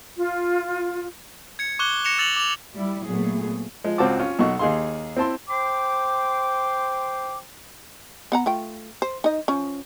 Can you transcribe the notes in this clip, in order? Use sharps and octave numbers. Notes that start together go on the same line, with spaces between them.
F4
G#6 C#7
C#6 D6 F#6 G#6 G7
A#6 C#7 E7 F7
E6 A6 F7 F#7
D6 F7
G3 E4
A#2 F#3 A3 B3 G#4
F3 G#3
C#2 C4 F4 F#4 A5 D6
C#4 F4
B1 B2 D#4 F#5 C#6
D#2 D#4 G#4 F5 C6
C4 E4 A5 C6
C5 G5 C6 D6
B3 F#5 A#5
A3 F4 G5
C5
D#4 D#5
F3 C#4